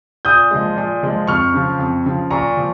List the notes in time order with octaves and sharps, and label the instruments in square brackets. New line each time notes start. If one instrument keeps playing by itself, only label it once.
[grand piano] A#2 D#6 G6
F3 G#3
A#2
F3 G#3
F2 C#6 F6
C#3 F3
F2
C#3 F3
A#2 A#5 C#6
F3